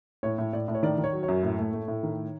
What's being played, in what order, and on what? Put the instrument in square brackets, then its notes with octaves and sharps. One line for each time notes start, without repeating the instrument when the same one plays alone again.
[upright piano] A2 C#5
A2
A2 D5
A2
C#5
D#3 D5
D#3
C#5
F#3
C#5
F#2
A2
A3
A3
A2
D#3